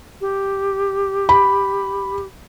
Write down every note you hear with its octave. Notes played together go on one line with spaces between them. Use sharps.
G4
B5